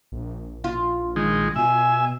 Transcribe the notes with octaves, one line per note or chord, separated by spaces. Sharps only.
A#1
F4
D#3 G#3
B2 E5 G#5